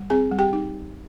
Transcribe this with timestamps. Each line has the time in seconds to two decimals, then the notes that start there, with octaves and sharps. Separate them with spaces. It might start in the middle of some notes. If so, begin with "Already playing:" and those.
Already playing: G3
0.10 C4 G#4 G#5
0.32 G3
0.39 G4 G5
0.53 D#4